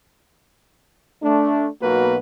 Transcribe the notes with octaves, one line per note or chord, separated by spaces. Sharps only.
A3 D4
B1 B2 A#3 F#4 B4